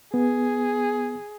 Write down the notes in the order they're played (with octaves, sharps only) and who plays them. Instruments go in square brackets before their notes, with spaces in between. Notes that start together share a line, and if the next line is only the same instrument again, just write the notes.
[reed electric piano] B3 [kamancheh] G#4